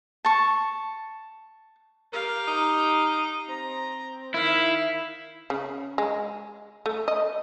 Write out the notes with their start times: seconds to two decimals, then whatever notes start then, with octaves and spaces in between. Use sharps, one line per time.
0.25 A5 C#6
2.13 G4 A#4 F5
2.48 D#4
3.48 C4 A#5
4.34 D#3 E4 F5
5.50 C#3
5.98 G#3
6.86 A3
7.08 D#5